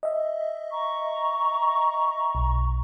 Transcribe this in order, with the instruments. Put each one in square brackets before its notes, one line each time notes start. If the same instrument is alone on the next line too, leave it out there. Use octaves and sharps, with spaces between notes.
[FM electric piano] D#5 E5
[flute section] A#5 C#6
[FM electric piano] B1